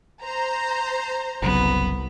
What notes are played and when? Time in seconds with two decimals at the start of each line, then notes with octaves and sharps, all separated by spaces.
0.22 C5 A#5
1.42 F#1 C2 C#3 F#3 B3